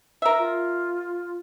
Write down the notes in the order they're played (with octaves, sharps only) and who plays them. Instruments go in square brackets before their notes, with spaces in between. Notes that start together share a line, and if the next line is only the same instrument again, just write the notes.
[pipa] A#4 E5
[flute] F4